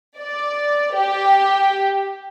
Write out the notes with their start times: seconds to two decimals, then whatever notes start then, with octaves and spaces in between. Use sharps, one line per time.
0.20 D5
0.93 G4